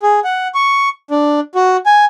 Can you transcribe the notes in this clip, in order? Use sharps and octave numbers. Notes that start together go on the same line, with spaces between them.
G#4
F#5
C#6
D4
F#4
G#5